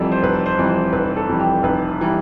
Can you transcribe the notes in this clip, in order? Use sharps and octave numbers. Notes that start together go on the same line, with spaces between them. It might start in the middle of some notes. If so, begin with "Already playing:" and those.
Already playing: F1 F2 E3 G3 A4
C5
F1 B4
C5
F2 E3 G3
C5
F1 B4
A4
F2 E3 G3
G4
F1 B4
E3 G3